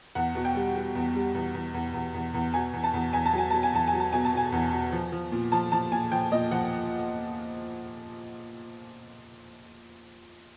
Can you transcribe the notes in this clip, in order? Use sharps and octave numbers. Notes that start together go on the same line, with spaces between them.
E2 F#5
B2
G5
G3
G3
E2
G3
E2
E2
E2
E2
E2
E2
B2 G#5
E2
A5
E2
E2 G#5
A5
F#3 G#5
F#3 A5
G#5
E2 A5
G#5
F#3
A5
B2 G#5
A5
B2 G#5
E2
B2
F3
F3
A#2
F3 A5
F3 A5
A#2 G#5
F3 G5
A#2 D#5
F3 F#5